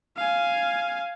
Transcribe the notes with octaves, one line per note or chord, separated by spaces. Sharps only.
F5 G#5